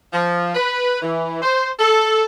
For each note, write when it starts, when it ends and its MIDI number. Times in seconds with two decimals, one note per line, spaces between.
0.12 0.53 53
0.55 1.00 71
1.02 1.41 52
1.42 1.70 72
1.80 2.24 69